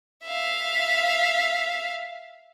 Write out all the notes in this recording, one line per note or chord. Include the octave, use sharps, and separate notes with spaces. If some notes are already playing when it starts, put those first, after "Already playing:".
E5 F5